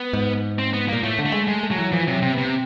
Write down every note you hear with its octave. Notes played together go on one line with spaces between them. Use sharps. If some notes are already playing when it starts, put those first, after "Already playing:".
Already playing: B3
G#2
C4
B3
A#2 A#3
A2 A3
D3
A3
G#3
G#3 A3
A3
F#3
E3
E3 F3
C3 F#3
C3 C4
C3 B3
C4